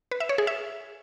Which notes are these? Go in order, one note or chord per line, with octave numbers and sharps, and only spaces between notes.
B4
E5
C#5
G#4
E5